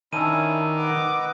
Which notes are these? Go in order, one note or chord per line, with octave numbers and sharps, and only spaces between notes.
D#3 C#4 D4 E4 E6 D#7
B4 D#5 F#5 D6